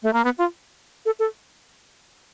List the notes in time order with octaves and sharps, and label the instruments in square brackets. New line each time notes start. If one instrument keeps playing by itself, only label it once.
[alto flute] A3
A#3
B3
F4
A4
A4